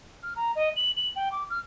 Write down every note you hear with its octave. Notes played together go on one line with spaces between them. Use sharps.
F6
A#5
D#5
F#7
F#7
G5
D6
F6